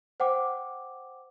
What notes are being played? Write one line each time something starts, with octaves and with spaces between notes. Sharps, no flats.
C5 F#5 G5 D6